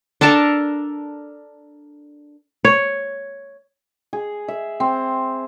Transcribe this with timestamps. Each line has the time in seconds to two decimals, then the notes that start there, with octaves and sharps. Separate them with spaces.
0.21 D4 A4 A#4 A5
2.65 C#5
4.13 G#4
4.48 E5
4.80 C4